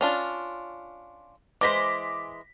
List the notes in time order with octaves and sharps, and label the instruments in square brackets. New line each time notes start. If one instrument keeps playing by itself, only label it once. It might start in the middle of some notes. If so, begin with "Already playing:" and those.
[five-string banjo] C#4 D4 F4
[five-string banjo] E3 G#3 C5 [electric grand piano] D6 A#6 B6